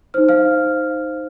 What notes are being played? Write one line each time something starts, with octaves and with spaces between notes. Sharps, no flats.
D#4 C5 F6
F5 F6